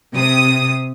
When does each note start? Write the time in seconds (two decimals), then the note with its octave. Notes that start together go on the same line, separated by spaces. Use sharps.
0.13 C3 D#6